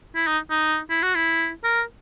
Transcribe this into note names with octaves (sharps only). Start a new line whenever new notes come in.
E4
D#4
D#4
E4
F#4
E4
A#4